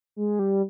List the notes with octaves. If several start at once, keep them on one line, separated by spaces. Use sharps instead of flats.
G#3
G3